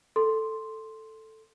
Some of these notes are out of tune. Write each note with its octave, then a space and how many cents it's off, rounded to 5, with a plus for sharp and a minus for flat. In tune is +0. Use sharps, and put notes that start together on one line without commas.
A4 +5 C6 +0